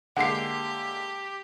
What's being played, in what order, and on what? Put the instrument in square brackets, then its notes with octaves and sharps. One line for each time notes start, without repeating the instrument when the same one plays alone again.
[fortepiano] D3 G#3 A#3 [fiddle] G4 [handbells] F#5 C7